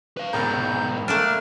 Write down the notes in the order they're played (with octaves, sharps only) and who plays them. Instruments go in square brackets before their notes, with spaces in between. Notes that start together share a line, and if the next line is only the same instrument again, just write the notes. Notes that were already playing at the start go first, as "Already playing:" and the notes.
[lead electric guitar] B4 F5
[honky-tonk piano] F1 C#2 A#4 [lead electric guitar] G#2 B2 [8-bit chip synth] G6
[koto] A3 A#3 D4 [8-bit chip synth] F6